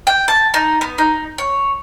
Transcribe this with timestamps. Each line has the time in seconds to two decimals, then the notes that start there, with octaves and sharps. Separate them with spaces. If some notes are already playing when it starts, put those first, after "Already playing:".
0.07 G5
0.28 A5
0.54 D#4
0.81 B3
0.98 D#4
1.38 C#5